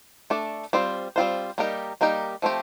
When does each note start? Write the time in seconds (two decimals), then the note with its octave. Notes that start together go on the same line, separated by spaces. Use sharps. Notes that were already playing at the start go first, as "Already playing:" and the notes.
0.30 A3 D4 A4 D5
0.73 G3 C4 F4 C5
1.16 G3 C4 F4 C5
1.58 G3 A#3 D#4 G4 A#4
2.01 G3 A#3 D#4 G4 A#4
2.42 F3 A3 C4 G4